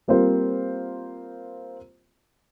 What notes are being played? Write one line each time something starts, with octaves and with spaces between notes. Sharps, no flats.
G3 A#3 C4 F4 C5